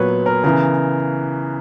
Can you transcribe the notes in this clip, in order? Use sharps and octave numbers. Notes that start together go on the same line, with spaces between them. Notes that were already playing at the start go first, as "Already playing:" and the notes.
Already playing: A#2 F#3 B3 B4 C#5
A#4
C#3 E3 B3 A#4